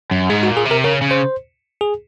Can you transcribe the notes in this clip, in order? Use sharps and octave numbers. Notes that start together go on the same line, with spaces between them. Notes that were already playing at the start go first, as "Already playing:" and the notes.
F#2
G#2 G#4
F#4
A#2
G#4
C3
A#4
C#3 A#4
C#3
C5
G#4